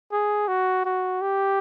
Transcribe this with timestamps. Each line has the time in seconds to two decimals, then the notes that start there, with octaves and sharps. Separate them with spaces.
0.12 G#4
0.48 F#4
0.85 F#4
1.21 G4